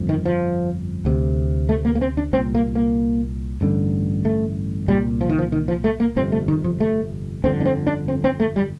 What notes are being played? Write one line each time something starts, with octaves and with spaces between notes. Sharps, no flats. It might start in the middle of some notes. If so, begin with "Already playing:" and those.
Already playing: G1 F2
D#3
F3
D2 C3
A3
A#3
A#3
C4
D4
C2 A#2 C4
A#3
A#3
A1 G2 D3
A3
C2 A#2 G3
F3
D#3
F3
D#3
F3
A3
A#3
G1 F2 C3 C4
A3
D#3
F3
A3
G1 F2 D3 C4
D4
C4
D4
C4
C4
A3
G3